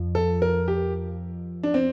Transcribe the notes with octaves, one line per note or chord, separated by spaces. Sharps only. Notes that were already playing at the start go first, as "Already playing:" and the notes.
Already playing: F2 F3
A4
A#4
G4
D4
C4